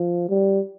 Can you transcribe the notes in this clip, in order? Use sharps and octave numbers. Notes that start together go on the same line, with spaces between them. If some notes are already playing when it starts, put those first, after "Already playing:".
Already playing: F3
G3